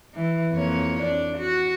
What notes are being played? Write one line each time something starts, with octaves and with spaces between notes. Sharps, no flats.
E3
F2 A#3 C#5
D4
F#4